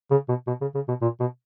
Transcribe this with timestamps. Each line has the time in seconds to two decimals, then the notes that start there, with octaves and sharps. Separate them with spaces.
0.11 C#3
0.28 B2
0.47 B2
0.61 C#3
0.75 C#3
0.88 B2
1.01 A#2
1.20 B2